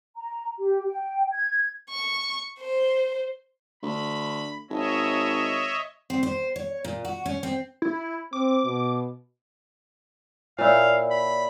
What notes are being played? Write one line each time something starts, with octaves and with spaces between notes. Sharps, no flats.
A#5
G4
G5
G#6
C#6
C5
D2 B5
G#1 C#5 D#5 E5
C4
C5
C#5
A#2
F#4
C#4
C4
E4
C4 D6
B2
A#2 E4 C#5 D5 F5
B5